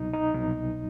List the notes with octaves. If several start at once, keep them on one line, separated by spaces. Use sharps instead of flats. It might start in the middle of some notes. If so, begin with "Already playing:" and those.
Already playing: C2 B2 F#3 D#4
D#4
C2 B2 F#3